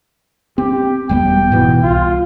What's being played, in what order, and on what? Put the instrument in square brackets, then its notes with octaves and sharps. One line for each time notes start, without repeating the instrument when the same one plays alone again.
[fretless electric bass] C4 [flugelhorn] G4
[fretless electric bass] E1 G3 B3 [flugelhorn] G5
[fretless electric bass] G#2 B2 E3
[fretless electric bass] C2 [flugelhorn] F4